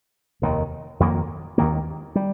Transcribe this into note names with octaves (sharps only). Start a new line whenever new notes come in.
F1 D#2 D#3
F2 D#3 A#3
D#2 D#3 A#3
G3